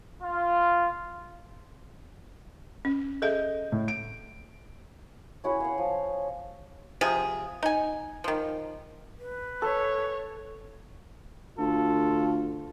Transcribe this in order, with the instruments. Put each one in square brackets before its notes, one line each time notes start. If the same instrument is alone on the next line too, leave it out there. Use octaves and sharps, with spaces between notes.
[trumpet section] F4
[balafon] C#4
[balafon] G#4 A4 E5 [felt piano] D#5 G6
[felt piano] A2
D7
[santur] C#4 E4 F#4 G#4
F5 F#5
F3
[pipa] C3 F3 G#4
D#4 G#5
D#3 F3
[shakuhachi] B4
[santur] A4 [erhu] C#5
[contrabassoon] D2 [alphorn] F4 [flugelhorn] A4